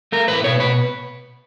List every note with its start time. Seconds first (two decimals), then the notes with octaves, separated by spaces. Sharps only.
0.12 A3 A#4
0.28 A2 B4
0.44 B2 C#5
0.60 B2 B4